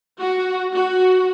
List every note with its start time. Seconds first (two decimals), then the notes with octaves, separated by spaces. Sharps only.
0.17 F#4
0.73 F#4